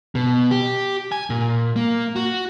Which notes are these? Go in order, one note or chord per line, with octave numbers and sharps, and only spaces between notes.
B2
G4
G#5
A#2
A#3
F#4